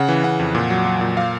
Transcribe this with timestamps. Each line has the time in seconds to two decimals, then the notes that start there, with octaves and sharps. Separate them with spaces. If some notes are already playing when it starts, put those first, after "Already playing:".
Already playing: C#3 F#5
0.08 E3
0.24 C#3 F#5
0.39 F2
0.55 A#2
0.70 F#3
0.86 F#3
1.01 A#2
1.17 F5